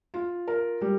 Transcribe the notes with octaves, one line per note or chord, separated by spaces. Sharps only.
F4
A#4
G3